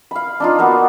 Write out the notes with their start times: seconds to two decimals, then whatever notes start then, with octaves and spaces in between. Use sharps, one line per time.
0.11 F5 B5
0.40 D4 D#4 F4
0.59 A#3 B3 F#4